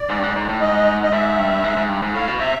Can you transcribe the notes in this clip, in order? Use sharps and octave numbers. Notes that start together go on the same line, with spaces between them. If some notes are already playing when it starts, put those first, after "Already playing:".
Already playing: D5
G#2
G2
G#2
G#2
A2
G#2 D#5
D#5
G#2 E5
G2
G#2
G#2
G2
G#2
A2 F5
B2
C3 E5